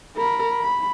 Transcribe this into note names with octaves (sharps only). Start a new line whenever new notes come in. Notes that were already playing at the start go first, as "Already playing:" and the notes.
A#4 B5
B5